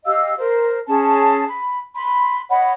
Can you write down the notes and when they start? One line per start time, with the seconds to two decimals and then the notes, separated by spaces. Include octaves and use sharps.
0.05 G4 D#5 F5 E6
0.38 A#4 C5
0.87 C#4 G#4 A5
1.48 B5
1.94 B5 C6
2.49 C#5 D#5 F#5 B5